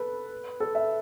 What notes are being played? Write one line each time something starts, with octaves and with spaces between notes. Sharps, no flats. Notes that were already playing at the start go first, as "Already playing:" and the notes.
Already playing: A4 B4
A4
E5